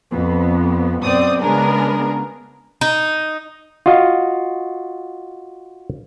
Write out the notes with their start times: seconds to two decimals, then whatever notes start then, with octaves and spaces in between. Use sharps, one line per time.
0.11 F2 B3
1.02 F#2 B2 C4 D5 D#6
1.41 C#3 G#3 B3 D4 G#4 A#4
2.81 D#4
3.86 F4 F#4 D#5 F5